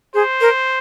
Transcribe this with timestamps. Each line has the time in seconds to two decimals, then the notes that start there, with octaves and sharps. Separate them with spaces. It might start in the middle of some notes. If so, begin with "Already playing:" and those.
0.14 G#4 C5
0.41 A#4